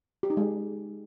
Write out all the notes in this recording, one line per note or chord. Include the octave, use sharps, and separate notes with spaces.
G4
D#4
G#3